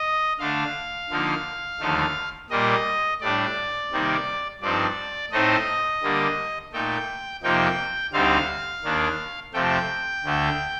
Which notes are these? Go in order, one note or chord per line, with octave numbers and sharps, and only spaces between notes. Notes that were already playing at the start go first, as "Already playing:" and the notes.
Already playing: D#5
D3 A3 D4 F5
D3 F3 A#3 D#4
D#2 D3 F3 A3 D#4
A#2 G3 A#3 D#5
A2 G3 D4 D5
C3 D#3 G3 A#3 D#4
G2 F3 C4 D#4 D5
A2 A3 C4 D#4 D#5
D3 G3 A#3
A#2 A3 D#4 G5
F2 C3 F3 A#3 D#4 G5
D2 D3 G3 C4 D#4 F5
D#2 D#3 A#3 D4
F2 C3 F3 A3 G5
D2 D3 A3